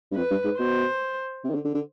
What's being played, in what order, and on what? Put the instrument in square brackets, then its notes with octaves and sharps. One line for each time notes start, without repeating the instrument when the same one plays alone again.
[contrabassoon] G2
[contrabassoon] F2 [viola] B4
[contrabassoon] G2
G#2
[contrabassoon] B2 [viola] C5
[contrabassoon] C3
D#3
D3
D3
D3